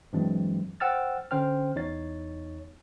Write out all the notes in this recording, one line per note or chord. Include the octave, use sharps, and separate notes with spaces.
G2 E3 F#3 G#3 C4
C5 F#5 G5 E6 F6 A6
D3 C#4 C5 G5 F6
E2 D#4 C#5 A6